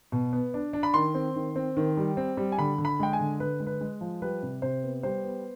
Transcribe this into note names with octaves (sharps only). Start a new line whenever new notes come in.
B2
B3
D4
D4
B5
D#3 C6
C4
D#3
C4
D#3
G3
C4
G3
G#5
D3 B5
D3
B5
G#3 G5
G#5
D3
D3 B4
G#3
B4
G#3
F3
G3 B4
C3
C3 C5
B3
G3 C5
B3